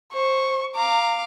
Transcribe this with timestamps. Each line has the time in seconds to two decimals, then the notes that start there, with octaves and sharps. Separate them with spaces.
0.13 C5 C#6
0.76 F5 A#5 D6